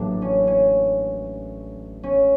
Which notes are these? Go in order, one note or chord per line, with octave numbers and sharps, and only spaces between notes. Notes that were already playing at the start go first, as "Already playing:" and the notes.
Already playing: A1 A2 F#3 A#3 D4
C#4
C#4
C#4